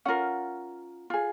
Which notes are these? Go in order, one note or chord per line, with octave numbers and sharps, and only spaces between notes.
C#4 F4 A#4 F#5
F4 G#4